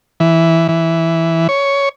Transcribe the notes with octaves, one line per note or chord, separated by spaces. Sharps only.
E3
E3
C#5